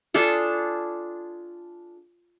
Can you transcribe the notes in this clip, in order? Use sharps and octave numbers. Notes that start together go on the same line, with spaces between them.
D4 F4 G#4 A4